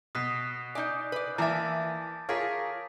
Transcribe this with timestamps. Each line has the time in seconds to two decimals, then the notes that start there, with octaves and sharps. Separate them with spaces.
0.15 B2 D#6 B6 C7
0.75 D#4 D5 G#5 D#6 G6
1.12 B4 D5
1.38 E3 A#3 E5 A5 D6 A6
2.29 F4 G#4 A#4 C#5 D6 B6